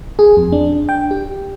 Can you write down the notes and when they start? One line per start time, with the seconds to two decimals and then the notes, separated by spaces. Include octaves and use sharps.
0.19 G#4
0.37 F2
0.52 D4
0.89 G5
1.11 G4